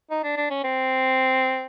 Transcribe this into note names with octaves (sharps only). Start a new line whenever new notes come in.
D#4
D4
D4
C#4
C4